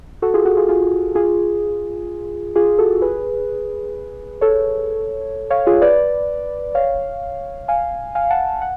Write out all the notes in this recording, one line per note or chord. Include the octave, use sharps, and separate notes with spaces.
F#4 A4
F4 G#4
F#4
F4 G#4
F4 G#4
F4 G#4
F4 G#4
F#4 A4
G#4 B4
A4 C#5
C#5 F5
F4 G#4
B4 D5
C#5 F5
F5 G#5
F5 G#5
F#5 A5
F#5